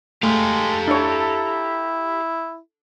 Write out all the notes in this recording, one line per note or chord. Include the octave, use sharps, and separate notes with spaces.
G#3 A3 G4 A4 F5 A#5
D4 E4 C#5